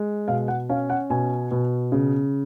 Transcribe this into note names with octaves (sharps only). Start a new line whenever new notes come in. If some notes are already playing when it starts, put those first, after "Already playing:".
Already playing: G#3
B2 F5
F#5
C#4 F5
F#5
B2 G#5
B2
C#3